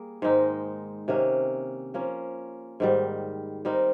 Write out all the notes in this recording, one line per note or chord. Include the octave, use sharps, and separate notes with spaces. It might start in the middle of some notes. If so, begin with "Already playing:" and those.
Already playing: G3 A#3 G#4
G#2 D#3 G#3 D#4
C3 D#3 A#3 C#4
F3 A#3 C#4
G#2 D#3 G3
G3 C4 D#4 A#4